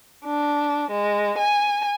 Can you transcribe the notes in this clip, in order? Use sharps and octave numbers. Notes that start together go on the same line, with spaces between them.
D4
G#3
G#5